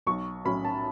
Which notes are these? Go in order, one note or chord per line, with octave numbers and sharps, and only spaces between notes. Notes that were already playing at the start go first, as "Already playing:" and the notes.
B1 C#6
A2 F#3 C#4 B5
A5